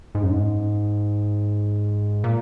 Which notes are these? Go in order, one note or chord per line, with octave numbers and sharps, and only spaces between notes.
G#2
F#2
G#2
A#2